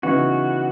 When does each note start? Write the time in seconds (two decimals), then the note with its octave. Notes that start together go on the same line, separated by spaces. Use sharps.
0.03 C#3 E3 B3 D#4 F#4